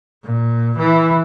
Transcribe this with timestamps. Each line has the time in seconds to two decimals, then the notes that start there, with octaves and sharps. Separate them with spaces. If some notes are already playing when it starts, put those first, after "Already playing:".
0.24 A#2
0.77 E3